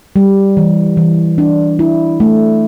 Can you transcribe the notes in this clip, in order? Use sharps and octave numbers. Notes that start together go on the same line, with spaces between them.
G3
E3
E3
D4
E4
A3